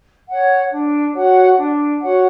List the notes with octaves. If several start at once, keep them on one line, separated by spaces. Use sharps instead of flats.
C#5 F#5
D4
F#4 C#5 F#5
D4
F#4 C#5 F#5